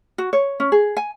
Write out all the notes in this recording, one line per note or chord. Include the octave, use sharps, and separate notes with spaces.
F#4
C#5
C#4
G#4
G#5